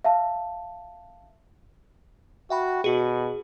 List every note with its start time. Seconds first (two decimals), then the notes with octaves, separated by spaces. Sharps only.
0.04 E5 F5 A5
2.50 F#4 E5 G5 B5
2.84 B2 F#4 G#4